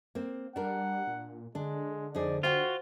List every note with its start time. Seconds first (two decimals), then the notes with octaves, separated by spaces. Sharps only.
0.15 A#3 C4
0.56 G3 D4 A#4 F#5
1.07 A#2
1.55 D3 G#3 D4
2.15 F2 D#4 G#4 D5
2.43 F4 F#4 C5 F5 G5